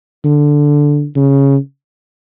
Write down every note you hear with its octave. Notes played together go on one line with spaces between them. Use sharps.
D3
C#3